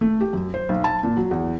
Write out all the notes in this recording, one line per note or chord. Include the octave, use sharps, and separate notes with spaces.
A3
G4
F#2
C5
B1
A5
A#2
F#3
E2